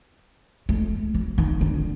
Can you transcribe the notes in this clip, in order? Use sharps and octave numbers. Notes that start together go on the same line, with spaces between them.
A3
F#3
D#3
D3